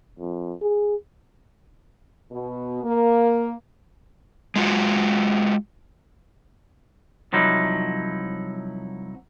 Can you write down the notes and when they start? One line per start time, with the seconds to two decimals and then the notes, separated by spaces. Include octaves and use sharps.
0.19 F2
0.62 G#4
2.32 B2
2.84 A#3
4.56 G#3 F4 F#4
7.33 C2 F3 F#3 D#4 E4